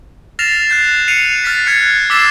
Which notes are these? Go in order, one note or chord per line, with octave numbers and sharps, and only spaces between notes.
F6 A6 A#6 C7 E7 F7
F#6 G6 C7
C7 C#7 D#7 F7
F6 A6 B6
F6 F#6 G#6 C#7
D6 E6 A6 B6 C7 E7